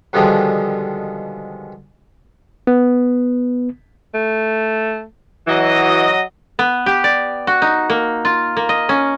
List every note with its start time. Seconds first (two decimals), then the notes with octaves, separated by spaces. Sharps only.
0.13 B2 D3 D#3 F3 G3 G#3
2.67 B3
4.14 A3
5.47 E3 F#3 D#5
6.59 B3
6.86 G4
7.04 D5
7.47 F#4
7.62 D#4
7.90 A#3
8.25 F4
8.57 A#3
8.69 D#5
8.89 C#4